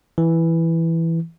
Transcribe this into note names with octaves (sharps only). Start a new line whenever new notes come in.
E3